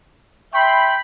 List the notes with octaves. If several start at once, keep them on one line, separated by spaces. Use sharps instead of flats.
E5 G5 B5 C6